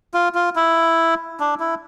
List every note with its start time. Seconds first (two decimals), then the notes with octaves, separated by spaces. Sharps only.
0.14 F4
0.35 F4
0.56 E4
1.40 D4
1.60 E4